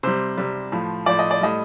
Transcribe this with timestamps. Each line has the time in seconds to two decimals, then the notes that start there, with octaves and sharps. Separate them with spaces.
0.03 C3 G3 C5
0.38 C3 G3
0.72 A2 F3
1.06 A2 F3 D5
1.19 D#5
1.31 D5
1.41 A2 G3 D#5